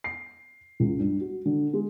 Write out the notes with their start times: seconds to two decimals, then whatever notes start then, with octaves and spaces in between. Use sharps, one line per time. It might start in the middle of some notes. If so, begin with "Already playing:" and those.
0.04 C7
0.80 C#2
0.99 G2
1.20 F#4
1.45 D3
1.73 G#3